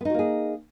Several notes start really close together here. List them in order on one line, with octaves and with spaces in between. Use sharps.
B3 D#4 F#4 A#3 G#4